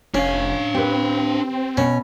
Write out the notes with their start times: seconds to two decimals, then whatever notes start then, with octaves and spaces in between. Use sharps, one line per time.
0.14 F1 C#4 D4 F5
0.75 C4 G4 B4
1.77 B2 C#4